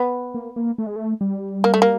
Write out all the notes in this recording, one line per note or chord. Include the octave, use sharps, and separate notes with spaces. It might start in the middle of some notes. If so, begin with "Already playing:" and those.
Already playing: B3
A#3
A#3
A3
G#3
A3
G3
A#3
A3
A#3